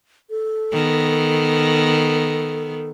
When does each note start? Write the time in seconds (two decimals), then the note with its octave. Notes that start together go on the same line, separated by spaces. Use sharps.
0.30 A4
0.73 D#3 B3